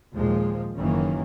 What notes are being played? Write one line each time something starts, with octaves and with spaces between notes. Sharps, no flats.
D#2 A#2 F3 G#3
F#1 F#2 D#3 E3 A#3 C#4